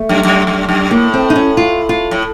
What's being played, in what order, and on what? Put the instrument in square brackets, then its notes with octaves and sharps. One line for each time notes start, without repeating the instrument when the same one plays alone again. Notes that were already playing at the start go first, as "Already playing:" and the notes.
Already playing: [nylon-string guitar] A3
[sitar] F#2
F#2
F#2
F#2
[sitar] A2 [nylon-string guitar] A#3
[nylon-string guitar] C4
D#4
C#4
F4
F4
[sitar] A2